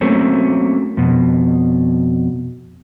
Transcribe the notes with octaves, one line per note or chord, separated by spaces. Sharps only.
F#3 A3 A#3 C4 C#4
F2 B2